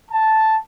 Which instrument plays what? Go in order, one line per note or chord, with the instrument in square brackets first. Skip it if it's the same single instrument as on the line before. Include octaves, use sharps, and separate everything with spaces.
[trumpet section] A5